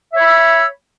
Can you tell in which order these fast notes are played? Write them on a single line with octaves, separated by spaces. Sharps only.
E5 C#5 B5 E6